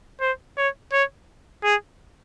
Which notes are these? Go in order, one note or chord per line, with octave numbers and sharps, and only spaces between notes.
C5
C#5
C#5
G#4